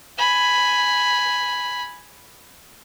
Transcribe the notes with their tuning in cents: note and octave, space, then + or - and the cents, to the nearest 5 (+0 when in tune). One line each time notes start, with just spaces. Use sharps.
G#5 +0 B5 +0